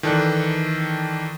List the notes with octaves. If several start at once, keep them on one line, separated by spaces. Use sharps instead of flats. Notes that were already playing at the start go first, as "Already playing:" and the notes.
D#3 E3 A4 D5 F#6